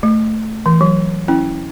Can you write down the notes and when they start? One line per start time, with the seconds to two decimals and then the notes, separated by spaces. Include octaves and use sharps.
0.03 A3
0.66 E3
0.81 F#3
1.28 C#4 E4